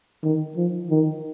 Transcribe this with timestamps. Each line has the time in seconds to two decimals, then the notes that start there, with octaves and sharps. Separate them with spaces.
0.23 D#3
0.57 F3
0.90 D#3